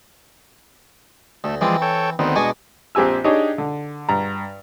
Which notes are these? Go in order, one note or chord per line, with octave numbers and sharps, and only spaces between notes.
D2 A3
E3 F3 G#3 C4 D5
A4 C#5 G5
D2 D#3 B3 C4
B2 G#3 D4 D#5 G#5 C#6
A#1 C4 G4 G#5 E6
D4 D#4 G4 G#4 C#5 D#5
D3
G2 A#5